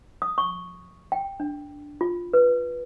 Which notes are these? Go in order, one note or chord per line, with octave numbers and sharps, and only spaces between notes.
D#6
C#6
G5
D4
F4
B4